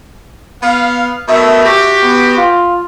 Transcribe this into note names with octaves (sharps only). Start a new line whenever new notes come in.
B3 F5
B2 D#3 A3 E5
F#4 G4
B3
F4